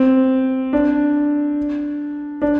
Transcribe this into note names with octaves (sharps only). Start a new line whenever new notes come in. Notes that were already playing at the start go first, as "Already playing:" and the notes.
Already playing: C4
D4
D4